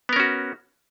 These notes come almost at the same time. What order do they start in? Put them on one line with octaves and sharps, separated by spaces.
B3 A#4 C#4 F#4